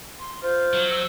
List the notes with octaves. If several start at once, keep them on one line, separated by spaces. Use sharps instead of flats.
C6
F4 C5
F#3
E6